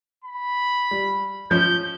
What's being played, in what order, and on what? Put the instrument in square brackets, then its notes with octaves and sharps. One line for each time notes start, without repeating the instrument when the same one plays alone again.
[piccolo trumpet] B5
[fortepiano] G3
[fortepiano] F3 C#4 [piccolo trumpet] G6